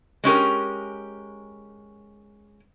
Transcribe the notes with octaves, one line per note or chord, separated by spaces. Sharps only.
G#3 C#4 G4 A#4